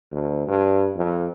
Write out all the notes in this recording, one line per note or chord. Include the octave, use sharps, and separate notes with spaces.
D2
G2
F2